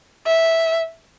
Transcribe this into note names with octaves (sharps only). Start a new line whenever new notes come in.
E5